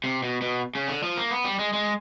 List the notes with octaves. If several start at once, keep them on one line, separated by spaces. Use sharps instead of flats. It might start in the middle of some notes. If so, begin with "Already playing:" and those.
C3
B2
B2
C#3
D3
F3
A#3
B3
G3
G#3
G#3